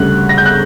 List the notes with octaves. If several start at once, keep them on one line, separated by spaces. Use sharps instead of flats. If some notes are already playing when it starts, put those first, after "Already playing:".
Already playing: D2 C#3 G3 F#6
A#6
G6
F#6